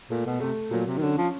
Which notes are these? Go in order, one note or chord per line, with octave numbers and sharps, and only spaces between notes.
A#2 A3
B2
C3 A3
A#2 F#3
C3
D#3
D3 C#4
F3